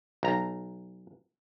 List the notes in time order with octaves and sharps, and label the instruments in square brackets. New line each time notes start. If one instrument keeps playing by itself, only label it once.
[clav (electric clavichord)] B1 A#5